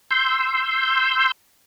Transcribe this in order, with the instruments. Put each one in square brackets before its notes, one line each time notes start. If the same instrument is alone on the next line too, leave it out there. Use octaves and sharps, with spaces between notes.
[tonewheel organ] C6 E6 G6